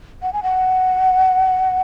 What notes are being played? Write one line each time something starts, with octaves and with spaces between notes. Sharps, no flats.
F#5
G#5
F#5